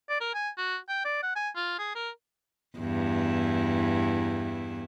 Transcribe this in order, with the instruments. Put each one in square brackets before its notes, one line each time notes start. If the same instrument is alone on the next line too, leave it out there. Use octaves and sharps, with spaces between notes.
[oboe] D5
A#4
G#5
F#4
G5
D5
F#5
G#5
F4
G#4
A#4
[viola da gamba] E2 G2 E4